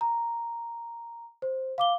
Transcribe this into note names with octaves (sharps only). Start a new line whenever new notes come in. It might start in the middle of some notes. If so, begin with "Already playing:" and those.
A#5
C5
F5 D6 G7